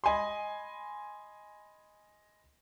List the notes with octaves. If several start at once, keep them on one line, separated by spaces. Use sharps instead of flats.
D#5 G#5 B5 C6